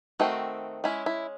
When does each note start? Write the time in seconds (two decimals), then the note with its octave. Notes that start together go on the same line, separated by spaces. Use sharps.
0.20 D#3 A3 C4 F#4
0.84 G#3 C#4 E4
1.06 E4